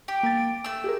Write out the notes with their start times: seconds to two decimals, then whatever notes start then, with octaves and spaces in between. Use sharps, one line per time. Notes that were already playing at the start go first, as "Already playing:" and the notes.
0.08 G4
0.23 A#3 A6
0.37 D7
0.64 A3 E6
0.84 G4 G#4 A#4